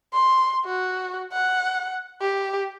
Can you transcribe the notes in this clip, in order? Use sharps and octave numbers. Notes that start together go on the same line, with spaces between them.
C6
F#4
F#5
G4